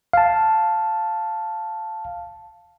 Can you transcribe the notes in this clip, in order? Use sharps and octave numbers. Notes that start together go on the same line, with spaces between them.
F5 A5